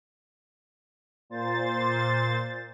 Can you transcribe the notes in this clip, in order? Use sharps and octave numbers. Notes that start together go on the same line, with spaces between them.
A#2 C5 A6